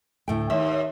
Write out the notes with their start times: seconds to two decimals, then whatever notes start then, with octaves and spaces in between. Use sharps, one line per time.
0.28 D2 A2 G5
0.50 D#2 E5